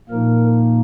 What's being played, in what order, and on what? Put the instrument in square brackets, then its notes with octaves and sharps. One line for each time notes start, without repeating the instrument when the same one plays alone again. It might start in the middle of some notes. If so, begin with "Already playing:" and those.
[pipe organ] A#2 F3 A#3 D#4 A#4